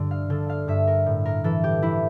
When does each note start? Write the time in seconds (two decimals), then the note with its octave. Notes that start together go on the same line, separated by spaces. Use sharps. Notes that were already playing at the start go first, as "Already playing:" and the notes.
Already playing: G2 D3
0.11 F5
0.30 D3 A4
0.50 F5
0.68 G2 E5
0.87 A#4
1.06 A2
1.26 A#4
1.44 E3 A4
1.64 G4
1.82 E3 E4